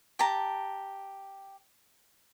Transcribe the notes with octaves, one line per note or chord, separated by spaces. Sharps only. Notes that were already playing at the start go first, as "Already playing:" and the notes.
G4 A5 A#5